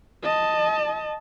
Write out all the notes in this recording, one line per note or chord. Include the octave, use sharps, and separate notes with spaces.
D#5 A5